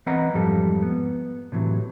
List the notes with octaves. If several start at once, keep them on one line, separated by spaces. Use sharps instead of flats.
E3 C4 B4 D#5 F#5 A#5
F2 G#2 F3 G3 A4
B3
A2 C3 E3 F#3